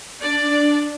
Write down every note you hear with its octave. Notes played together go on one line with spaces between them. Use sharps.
D4 D5